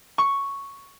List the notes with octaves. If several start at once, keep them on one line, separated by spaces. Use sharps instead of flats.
C#6